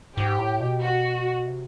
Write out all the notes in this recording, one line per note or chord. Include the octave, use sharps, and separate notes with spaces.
G#2 G4
A2
B2
F#4
C3